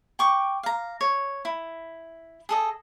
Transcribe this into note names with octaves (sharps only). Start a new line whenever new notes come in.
G5 C#6 D6
F5 A#5
C#5
E4
G#4 A4 D#5